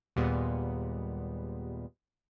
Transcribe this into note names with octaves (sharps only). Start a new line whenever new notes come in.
D#2 A#2 G3 G#3 B3